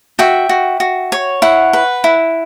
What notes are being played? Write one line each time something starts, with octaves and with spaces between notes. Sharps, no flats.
F#4 E5 G5
F#4
F#4
C#5
E4 F#5
B4
E4